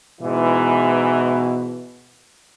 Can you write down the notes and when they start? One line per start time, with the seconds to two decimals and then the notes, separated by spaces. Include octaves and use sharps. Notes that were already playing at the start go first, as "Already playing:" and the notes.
0.22 G#2 B2 E3